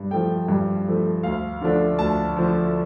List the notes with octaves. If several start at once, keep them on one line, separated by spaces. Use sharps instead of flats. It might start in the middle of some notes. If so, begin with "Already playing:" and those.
Already playing: G2
F3 A3 G5
G2
F3 A3
D2 F5
D3 F3 A3 D4
D2 A5
D3 F3 A3 D4